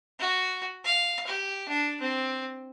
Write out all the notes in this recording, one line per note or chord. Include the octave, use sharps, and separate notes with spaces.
F#4
F5
G4
D4
C4